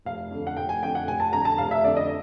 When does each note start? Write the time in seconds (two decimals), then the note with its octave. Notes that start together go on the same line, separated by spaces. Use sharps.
0.05 F1 F5
0.31 F2 D3
0.47 F#5
0.57 F1 G5
0.69 G#5
0.82 F2 D3 G5
0.95 F#5
1.07 F1 G#5
1.20 A5
1.33 F2 D3 A#5
1.45 A5
1.58 F1 F5
1.71 E5
1.84 F2 D3 D5
1.97 D#5